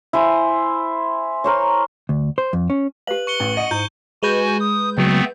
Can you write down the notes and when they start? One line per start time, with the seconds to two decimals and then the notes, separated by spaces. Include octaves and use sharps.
0.13 E4 C5 G#5
1.44 A#4 C5 C#5
2.09 D2
2.38 C5
2.53 F2
2.70 C#4
3.07 G4 B4 F5 F#7
3.27 C#6 C#7 G7
3.40 A1
3.57 D#5 F#5 C#7 D#7
3.71 G#2 E4 G6
4.23 G#3 F#4 B4 G#5 G6
4.60 D#6
4.98 C#2 F#3 A3 B3 C4